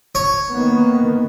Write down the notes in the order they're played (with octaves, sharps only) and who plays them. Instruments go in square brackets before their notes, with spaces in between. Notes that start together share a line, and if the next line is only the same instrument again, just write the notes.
[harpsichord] C#5
[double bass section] D#3 A#3 B3